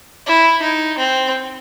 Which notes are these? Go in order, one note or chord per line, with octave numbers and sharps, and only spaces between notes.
E4
D#4
C4